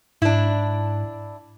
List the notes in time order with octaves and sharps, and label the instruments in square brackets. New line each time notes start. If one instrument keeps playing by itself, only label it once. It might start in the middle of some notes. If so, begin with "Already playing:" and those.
[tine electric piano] G#2 [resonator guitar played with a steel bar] D4 E4